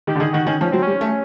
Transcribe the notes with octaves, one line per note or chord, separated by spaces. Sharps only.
D#3 G4
D3
D#3 G#4
D#3 F#4
D#3 C#4
F3 C#4
F#3 C4
G3 C#4
A3